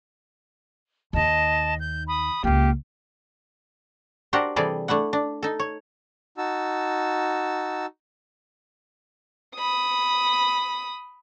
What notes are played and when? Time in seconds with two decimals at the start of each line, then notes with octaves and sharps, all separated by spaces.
1.13 D#2 D#3 D#5 A5
1.79 G6
2.08 B5 D#6
2.44 C#2 A#3 F4 G4
4.33 D4 F#4 G4 A#4 C5 F#5
4.56 C3 E3 G3 G#4 A4 D5
4.88 A3 D4 E4 F#5
5.13 D4
5.43 D#4 A4
5.59 C#5
6.38 D#4 F#4 A5 E6
9.57 B5 D#6